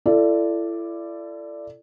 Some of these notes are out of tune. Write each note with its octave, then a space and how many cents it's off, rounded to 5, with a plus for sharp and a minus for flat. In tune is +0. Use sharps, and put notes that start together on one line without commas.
E4 +35 A4 +10 D5 +0